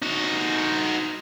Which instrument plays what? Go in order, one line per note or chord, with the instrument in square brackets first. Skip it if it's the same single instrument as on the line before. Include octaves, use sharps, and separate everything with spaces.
[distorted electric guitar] D#4 F#4